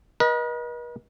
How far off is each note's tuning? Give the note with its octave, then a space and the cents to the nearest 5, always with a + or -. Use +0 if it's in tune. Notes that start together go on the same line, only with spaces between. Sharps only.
B4 -45 D#5 +0